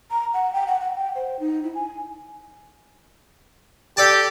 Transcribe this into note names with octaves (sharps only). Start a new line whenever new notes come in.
A#5
F#5
G5
F#5
F#5
G5
C5
D#4
E4
G#5
G4 A4 D5 A5